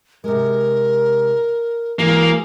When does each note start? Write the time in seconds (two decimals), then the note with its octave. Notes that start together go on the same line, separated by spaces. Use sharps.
0.24 C3 G#3 A#4
1.99 E3 G#3 A#3 F#4 G#4